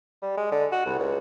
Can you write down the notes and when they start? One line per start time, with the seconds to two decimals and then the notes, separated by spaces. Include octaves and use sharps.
0.22 G3
0.37 G#3
0.52 D3
0.72 F#4
0.86 C2
0.99 C#2